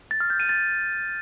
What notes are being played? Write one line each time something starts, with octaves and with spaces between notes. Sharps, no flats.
A6
F6
G6
D#7
A6